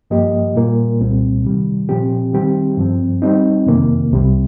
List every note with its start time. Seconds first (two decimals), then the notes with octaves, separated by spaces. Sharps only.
0.10 G2 F3 A#3 G4 D#5
0.55 A#2 G3 A#3 F4 A#4
1.00 C2 A#2 G3 C4
1.44 C3 D#3 G3
1.89 A#2 F3 C4 G4
2.33 D#3 G3 C4 G4
2.77 G2 F3 C4
3.22 G3 C4 D#4
3.66 F2 C3 D#3 A#3
4.11 C2 C3 G3